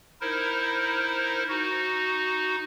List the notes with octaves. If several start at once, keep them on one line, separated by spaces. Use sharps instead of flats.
D#4 E4 A#4 C5
D#4 F#4